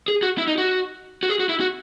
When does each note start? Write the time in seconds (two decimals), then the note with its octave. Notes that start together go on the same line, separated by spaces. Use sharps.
0.08 G#4
0.23 F#4
0.38 E4
0.47 D#4
0.58 F#4
1.23 F#4
1.29 G#4
1.40 F#4
1.49 E4
1.60 F#4